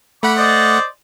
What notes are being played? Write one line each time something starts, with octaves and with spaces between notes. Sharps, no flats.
A3 F#5 B5 D6
C5 D5 D#5